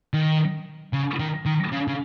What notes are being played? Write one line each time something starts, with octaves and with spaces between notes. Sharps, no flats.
D#3
C#3
D#3
D#3
C#3
C#3